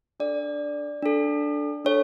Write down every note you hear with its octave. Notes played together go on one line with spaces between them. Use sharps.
D4 A4 D5
D4 A4
D4 A4 C#5